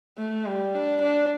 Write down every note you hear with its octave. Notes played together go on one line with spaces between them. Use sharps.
A3
G3
D4
D4